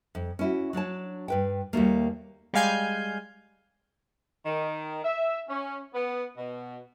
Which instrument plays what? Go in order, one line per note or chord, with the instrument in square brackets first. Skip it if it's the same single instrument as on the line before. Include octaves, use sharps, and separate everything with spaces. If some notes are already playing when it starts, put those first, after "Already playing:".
[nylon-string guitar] F2
C#4 E4 F#4
F#3 D4 C#5 A5
G2 B4 G5
D#2 G3 A3 A#3
[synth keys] G3 G#3 F5 G#5 G6
[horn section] D#3
E5
C#4
B3
B2